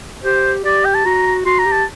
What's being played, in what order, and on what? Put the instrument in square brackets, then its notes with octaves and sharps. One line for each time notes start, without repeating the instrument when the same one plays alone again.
[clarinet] G4 [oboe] C5
[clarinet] G4 [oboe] D5
[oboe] G5
A5
[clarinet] F#4 [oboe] A#5
[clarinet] F#4 [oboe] C6
[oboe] A#5
[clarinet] G4
[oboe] A5